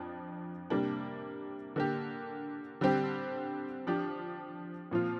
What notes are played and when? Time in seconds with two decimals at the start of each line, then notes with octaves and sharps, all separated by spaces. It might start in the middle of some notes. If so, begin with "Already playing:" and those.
Already playing: F2 F3 D4
0.70 C3 G3 A#3 D4
1.76 D3 A#3 G4
2.81 D3 G3 C4 G4
3.87 F3 D4 G4
4.91 A#2 F3 C4 F4